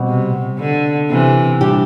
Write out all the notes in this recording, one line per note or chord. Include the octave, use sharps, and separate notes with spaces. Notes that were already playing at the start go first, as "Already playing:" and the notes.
Already playing: B2 G3 C4 F#4
C3
D3
C3 E3
G3 D4 G4